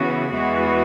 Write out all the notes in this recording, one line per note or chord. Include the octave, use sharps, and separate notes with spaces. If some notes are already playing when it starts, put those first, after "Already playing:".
Already playing: C#3 E3 B3 F#4
E2 E3 G#3 B3 F#4